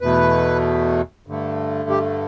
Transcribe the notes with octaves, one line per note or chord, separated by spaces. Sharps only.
E2 B2 A3 B4
G2 D3 A3
G4